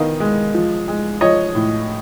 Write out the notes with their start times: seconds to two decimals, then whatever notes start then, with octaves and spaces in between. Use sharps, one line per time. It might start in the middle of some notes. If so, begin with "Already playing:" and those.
Already playing: D#3 B3 D#5 F5
0.20 G#3
0.54 F3
0.88 G#3
1.21 F3 C#5 D#5
1.55 A2